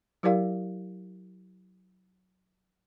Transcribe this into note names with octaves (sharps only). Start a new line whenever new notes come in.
F#3 E4 G4 A#4 D5 F5